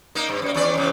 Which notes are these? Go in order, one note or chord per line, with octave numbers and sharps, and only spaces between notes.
A#3 D#4
G2
F#2 A#3
E2 C#4 D5
E2 G#2 C#3